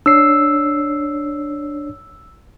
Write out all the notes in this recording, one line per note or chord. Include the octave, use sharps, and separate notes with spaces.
D4 C#5 E6 C7